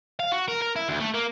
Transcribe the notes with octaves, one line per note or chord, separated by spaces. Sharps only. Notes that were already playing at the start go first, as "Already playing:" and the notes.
F5
F#4
A#4
A#4
E4
D2
A3
A#3